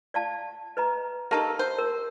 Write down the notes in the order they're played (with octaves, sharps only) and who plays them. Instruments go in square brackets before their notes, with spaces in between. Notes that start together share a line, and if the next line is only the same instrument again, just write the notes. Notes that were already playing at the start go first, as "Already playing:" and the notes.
[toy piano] D5 F5 A5
B4 D#5 A#5
[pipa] A#3 D#4 A4 [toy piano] G4 A5
[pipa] C5
[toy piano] A#4